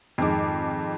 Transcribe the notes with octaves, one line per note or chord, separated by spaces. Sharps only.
F2 G#2 D#3 G#3 D6